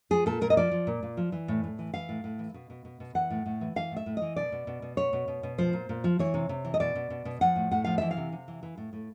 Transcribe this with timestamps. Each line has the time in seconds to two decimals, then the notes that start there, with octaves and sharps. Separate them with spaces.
0.11 F3 G#4
0.26 A#2 A4
0.41 A#2 A#4
0.50 D#5
0.57 F3 D5
0.71 F3
0.87 A#2
1.03 A#2
1.17 F3
1.32 E3
1.48 A2
1.64 A2
1.79 E3
1.94 E3 F5
2.09 A2
2.24 A2
2.39 E3
2.54 B2
2.70 B2
2.85 B2
3.00 B2
3.15 E3 F#5
3.30 A2
3.46 A2
3.61 E3
3.76 E3 F5
3.91 A2
3.96 E5
4.06 A2
4.17 E3 D#5
4.36 B2 D5
4.52 B2
4.67 B2
4.82 B2
4.97 B2 C#5
5.13 B2
5.28 B2
5.43 B2
5.58 F3 C5
5.73 A#2
5.89 A#2
6.04 F3
6.19 E3 C#5
6.34 C3
6.49 C3
6.65 E3
6.74 D#5
6.80 B2 D5
6.95 B2
7.10 B2
7.25 B2
7.41 F3 F#5
7.56 A2
7.71 A2 F#5
7.84 F3 F5
7.98 E3 E5
8.11 F5
8.17 C3
8.32 C3
8.48 E3
8.63 E3
8.78 A2
8.93 A2